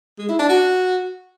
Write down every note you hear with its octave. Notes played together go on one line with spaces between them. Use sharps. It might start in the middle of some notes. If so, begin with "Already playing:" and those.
G#3
E4
D4
F#4